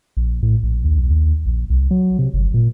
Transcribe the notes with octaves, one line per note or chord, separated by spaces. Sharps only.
A#1
A2
A#1
D#2
B1
D#2
A#1
C2
F#3
C3
G1
A#2